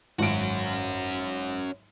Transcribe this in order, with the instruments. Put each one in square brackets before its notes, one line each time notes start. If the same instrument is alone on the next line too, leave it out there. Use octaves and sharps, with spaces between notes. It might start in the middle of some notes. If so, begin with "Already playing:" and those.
[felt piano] G#1 F#2 D7 [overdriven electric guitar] C#4 F#4